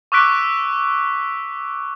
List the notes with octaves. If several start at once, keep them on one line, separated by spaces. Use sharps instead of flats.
C#6 D6 E6 F#6 B6 D7